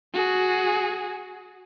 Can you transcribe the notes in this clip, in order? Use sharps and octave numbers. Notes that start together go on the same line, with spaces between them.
F#4 G#4